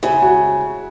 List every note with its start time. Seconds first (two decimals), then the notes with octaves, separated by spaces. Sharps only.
0.03 C#3 E4
0.22 F#4